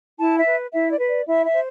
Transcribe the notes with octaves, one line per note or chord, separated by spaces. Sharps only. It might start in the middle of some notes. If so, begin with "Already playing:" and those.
E4 A5
E5
B4
E4 E5
D5
B4
D5
E4 E5
E5
C5